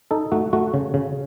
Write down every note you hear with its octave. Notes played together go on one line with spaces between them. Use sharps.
D#4 A4
A3 F#4
A3 F#4
C#3
C#3